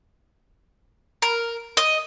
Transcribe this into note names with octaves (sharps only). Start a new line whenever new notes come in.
A#4
D#5